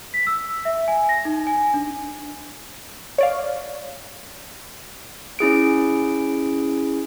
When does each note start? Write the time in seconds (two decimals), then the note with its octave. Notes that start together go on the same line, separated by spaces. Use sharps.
0.14 B6
0.27 E6
0.65 E5
0.88 G#5
1.09 A#6
1.25 D#4
1.47 G#5
1.74 D4
3.18 C#5 D5 F5
5.39 C#4 E4 G#4 D7